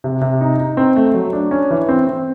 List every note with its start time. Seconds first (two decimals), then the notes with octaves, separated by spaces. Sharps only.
0.04 C3
0.21 C3
0.41 D#4
0.59 D#4
0.77 C4
0.96 A3
1.14 F#3
1.33 D4
1.51 C#4
1.71 E3
1.88 C4
2.07 C4